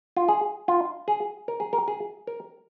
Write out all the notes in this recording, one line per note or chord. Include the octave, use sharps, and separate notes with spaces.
F4
G#4
F4
G#4
A#4
G#4
A#4
G#4
A#4